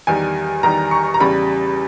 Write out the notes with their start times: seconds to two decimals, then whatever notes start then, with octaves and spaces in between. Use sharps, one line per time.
0.07 E2 D#3 G3 G#5
0.63 E2 D#3 G3 A#5
0.91 C#6
1.14 A#5
1.20 E2 C#3 G3 B5